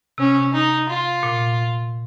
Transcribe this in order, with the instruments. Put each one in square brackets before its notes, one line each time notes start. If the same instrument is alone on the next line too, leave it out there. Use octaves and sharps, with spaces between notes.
[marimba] C3 [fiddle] C#4
[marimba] C3
[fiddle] D#4
F4
[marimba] A#2